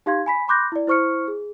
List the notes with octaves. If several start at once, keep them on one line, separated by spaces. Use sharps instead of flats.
D#4 G4 F5 C6 G#6
G#5 B5 B6
B5 C6 D6 F#6 G6 A#6
E4 D5
E4 C5 C#6 F6 C#7
G#4